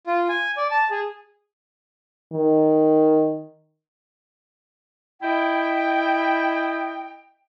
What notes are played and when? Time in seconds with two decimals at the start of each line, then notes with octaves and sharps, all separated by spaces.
0.07 F4
0.29 G#5
0.57 D5
0.71 A5
0.91 G#4
2.33 D#3
5.22 E4 D#5 G5